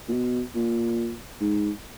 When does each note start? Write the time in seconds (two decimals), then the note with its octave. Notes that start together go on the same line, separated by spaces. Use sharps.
0.09 A#2
0.13 B2
0.55 A#2
1.41 G#2